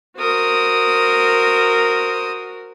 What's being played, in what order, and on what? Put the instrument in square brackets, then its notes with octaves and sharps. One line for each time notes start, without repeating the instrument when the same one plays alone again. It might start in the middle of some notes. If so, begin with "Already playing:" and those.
[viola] F#4 A#4 [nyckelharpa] C5 D#6